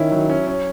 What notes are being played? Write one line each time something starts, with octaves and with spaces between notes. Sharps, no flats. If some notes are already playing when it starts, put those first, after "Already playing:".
Already playing: D#3 C#4 E4
F#3
C#4
C#4